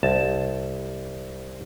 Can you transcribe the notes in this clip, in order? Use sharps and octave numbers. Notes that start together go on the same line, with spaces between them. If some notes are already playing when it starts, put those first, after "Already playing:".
C2 A5